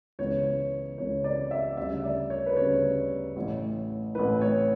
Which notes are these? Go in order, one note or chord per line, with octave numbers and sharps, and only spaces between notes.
C#2 C#3 E3 B3 C#5
C#2 C#3 E3 B3 C#5
D5
E5
D2 C#3 G3 E5
D5
C#5
B4
D2 C#3 G3 C#5
A1 A2 E3
A1 A2 E3 B4
C#5